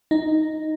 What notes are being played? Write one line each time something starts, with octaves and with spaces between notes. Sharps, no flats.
D#4